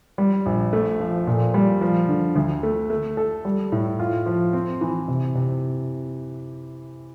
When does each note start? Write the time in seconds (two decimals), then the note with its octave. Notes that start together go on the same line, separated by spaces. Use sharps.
0.18 G3
0.46 A#1
0.73 A3
1.00 F3
1.27 A#2
1.54 G3
1.81 F3
2.08 D3
2.36 D2
2.63 A3
2.90 A3
3.17 A4
3.45 G3
3.72 A2
3.99 F4
4.26 F3
4.53 C4
4.81 E3
5.08 C3
5.35 C3